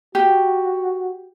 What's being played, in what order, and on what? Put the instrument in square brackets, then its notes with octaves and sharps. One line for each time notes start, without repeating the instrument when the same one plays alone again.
[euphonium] F#4 [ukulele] G4